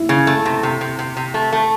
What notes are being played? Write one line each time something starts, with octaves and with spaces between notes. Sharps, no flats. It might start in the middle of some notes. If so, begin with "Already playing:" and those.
Already playing: E4
C#3
A3
C3
C3
C3
C3
C3
A3
A3